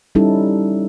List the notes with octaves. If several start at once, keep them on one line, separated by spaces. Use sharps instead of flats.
G3 C#4 D#4 E4 A4